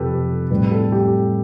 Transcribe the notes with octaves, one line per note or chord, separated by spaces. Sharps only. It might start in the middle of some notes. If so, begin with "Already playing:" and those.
Already playing: F2 C3 F3 G4 A4 B4
A2 G3 C4 B4
A4
G4